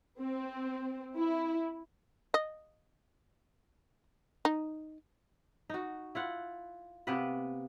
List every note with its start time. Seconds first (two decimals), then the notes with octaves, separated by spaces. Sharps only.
0.20 C4
1.16 E4
2.34 D#5
4.45 D#4
5.70 D#4 F#4
6.15 E4 F4 F#5
7.07 C3 A#3 B3 B4